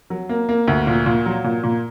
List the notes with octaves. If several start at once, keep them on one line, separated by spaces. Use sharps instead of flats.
F#3
A#3
A#3
D2
A#2
A#2
F#3
A#2
A#2